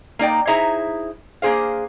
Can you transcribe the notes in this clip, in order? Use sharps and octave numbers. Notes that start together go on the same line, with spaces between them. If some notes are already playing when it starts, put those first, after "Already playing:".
A#3 D#4 D5 G5
D#4 E4 G#4 C5 E5 A#5
A#3 D4 G#4 C5 F5